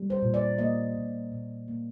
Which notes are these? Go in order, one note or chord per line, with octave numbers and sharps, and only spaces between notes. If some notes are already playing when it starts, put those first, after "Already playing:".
Already playing: G3
C5
A#2
D5
A#3 D#5
A#2
A#2
A#3